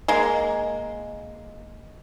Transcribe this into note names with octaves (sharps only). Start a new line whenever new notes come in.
G#3 A#3